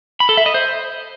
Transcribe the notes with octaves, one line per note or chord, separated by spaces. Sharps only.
B5
A4
E5
D#5
C5